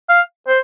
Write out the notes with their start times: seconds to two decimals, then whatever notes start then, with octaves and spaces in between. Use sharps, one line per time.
0.10 F5
0.47 C5